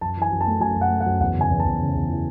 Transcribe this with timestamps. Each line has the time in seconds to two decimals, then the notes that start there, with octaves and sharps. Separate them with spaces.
0.01 F#2 A5
0.16 E3
0.22 G#5
0.32 F#2
0.41 A5
0.47 A3
0.60 F#2 G#5
0.76 F#2
0.81 F#5
0.90 A3
1.01 F#5
1.06 F#2
1.20 E2 F#5
1.35 C#3
1.41 G#5
1.51 E2
1.60 A5
1.65 E2
1.79 C#3
1.95 E2
2.10 E3